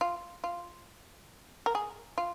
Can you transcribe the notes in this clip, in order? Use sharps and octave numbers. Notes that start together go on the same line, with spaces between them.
F4
F4
A#4
G#4
F4